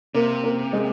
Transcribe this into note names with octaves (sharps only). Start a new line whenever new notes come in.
C3 A#3
A#3
G#3